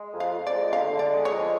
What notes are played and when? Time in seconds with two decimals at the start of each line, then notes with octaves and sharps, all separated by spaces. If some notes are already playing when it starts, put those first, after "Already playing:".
Already playing: G#3
0.14 F2
0.20 F5
0.33 F2
0.47 D5
0.54 G#3
0.73 D3 F5
0.92 D3
0.99 D5
1.13 G#3
1.25 C#5
1.32 F2